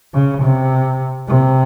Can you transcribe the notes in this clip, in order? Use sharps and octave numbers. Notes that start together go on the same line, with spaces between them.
C#3
C3
C3